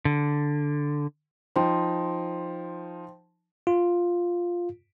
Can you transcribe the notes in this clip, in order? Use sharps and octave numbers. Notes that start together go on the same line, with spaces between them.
D3
F3 D#4 C5 G5 C6
F4